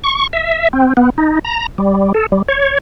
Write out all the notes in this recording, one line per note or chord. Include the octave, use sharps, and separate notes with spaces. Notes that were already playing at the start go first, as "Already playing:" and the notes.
C#6
E5
C4
B3
D#4
A#5
G3
A4
G3
C#5